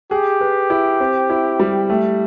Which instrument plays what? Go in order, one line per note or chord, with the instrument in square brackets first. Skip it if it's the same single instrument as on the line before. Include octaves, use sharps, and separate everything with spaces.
[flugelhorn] G4 [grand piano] G#4
[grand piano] B4
E4
C4
E4
G3
A3